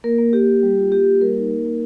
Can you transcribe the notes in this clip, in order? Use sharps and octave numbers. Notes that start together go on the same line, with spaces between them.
A#3 A#4
A#3
A#3 G4
A#3
G3
F4
A#3 G4
A#3
G3 A#4
D#4
A#3
A#3